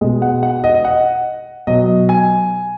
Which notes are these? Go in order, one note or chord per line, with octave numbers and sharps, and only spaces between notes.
B2 G#3 D#5
F#5
F#5
D#5
D#5
F#5
B2 F#3 D#5
G#5